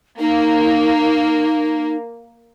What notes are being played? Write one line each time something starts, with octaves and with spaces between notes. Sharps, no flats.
A#3 D#4